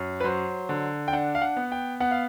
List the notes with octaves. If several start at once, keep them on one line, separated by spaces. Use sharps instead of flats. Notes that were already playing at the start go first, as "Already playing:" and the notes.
Already playing: F#2
B4
F#3 C5
D3
G5
D4 F#5
F5
F#5
B3
G5
B3 F#5
F5